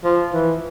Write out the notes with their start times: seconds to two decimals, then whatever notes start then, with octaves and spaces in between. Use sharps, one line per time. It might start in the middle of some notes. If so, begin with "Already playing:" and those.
0.04 F3
0.33 E3